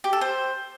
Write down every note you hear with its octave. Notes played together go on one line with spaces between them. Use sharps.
G4
A4
C5